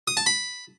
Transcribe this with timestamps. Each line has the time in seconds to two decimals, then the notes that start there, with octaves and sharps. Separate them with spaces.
0.08 D#6
0.17 A5
0.26 B5